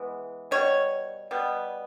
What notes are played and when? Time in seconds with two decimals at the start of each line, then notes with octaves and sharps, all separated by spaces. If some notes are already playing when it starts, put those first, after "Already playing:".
Already playing: E3 G#3 B3
0.51 B2 G3 C#5
1.31 B2 G3 B3